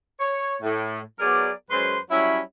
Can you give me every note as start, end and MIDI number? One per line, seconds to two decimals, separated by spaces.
0.20 0.56 73
0.62 0.99 45
1.19 1.50 54
1.19 1.50 59
1.19 1.50 68
1.19 1.50 70
1.19 1.50 74
1.70 1.96 42
1.70 1.96 56
1.70 1.96 61
1.70 1.96 71
1.70 1.96 72
1.70 1.96 84
2.11 2.39 54
2.11 2.39 55
2.11 2.39 61
2.11 2.39 64